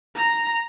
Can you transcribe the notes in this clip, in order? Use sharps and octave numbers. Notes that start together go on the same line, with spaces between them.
A#5